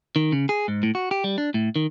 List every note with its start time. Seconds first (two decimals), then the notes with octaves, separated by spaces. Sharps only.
0.16 D#3
0.32 C#3
0.49 G#4
0.68 G#2
0.83 A2
0.95 F#4
1.11 G4
1.24 G3
1.38 D4
1.54 A2
1.76 D#3